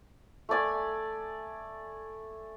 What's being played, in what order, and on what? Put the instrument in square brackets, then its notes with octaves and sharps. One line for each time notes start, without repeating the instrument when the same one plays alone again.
[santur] A3 A4 D5 G#5